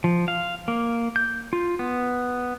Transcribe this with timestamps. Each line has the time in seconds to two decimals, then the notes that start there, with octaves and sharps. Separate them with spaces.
0.04 F3
0.28 F5
0.68 A#3
1.16 G6
1.53 F4
1.79 B3